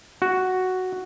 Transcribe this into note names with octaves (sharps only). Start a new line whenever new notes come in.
F#4